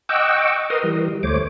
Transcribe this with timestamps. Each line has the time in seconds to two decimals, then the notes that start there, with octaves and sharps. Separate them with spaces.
0.09 D#5 F#5 G5 C#6 D6 E6
0.70 A#4 B4 A#5 C6 D#6
0.83 E3 G3
1.23 D2 A3 C5 C#5 D6